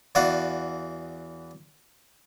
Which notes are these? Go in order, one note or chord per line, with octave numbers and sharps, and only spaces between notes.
E2 E3 F#4 D5 F5 F#5